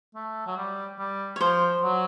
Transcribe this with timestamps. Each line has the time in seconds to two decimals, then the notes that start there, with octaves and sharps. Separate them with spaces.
0.15 A3
0.47 F#3
0.57 G3
0.99 G3
1.36 C#5
1.40 F3 C5
1.82 F#3